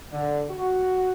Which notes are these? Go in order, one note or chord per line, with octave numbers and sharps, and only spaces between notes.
D3
F#4